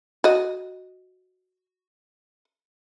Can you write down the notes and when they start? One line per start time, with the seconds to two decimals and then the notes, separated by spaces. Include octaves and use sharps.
0.24 F#4 D#5